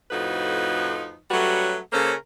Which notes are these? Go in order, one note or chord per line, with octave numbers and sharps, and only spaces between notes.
F2 A2 F3 D#4 F#4 B4
F#3 G3 A3 C#4 F#4 B4
C#3 A#3 C#4 A4 A#4 C5